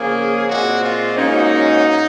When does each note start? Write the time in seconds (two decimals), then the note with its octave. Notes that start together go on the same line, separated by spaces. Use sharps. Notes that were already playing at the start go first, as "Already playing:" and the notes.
Already playing: C#3 F3 A#3 C#4 G#4
0.48 A#2 G#3 C4 F#4
0.83 F4
1.16 G#2 F#3 A#3 C#4 D#4